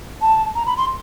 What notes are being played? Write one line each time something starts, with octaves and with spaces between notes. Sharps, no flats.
A5
A#5
B5
C6